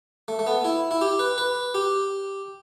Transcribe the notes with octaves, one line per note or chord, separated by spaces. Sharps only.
A3
A3
B3
E4
E4
G4
B4
B4
G4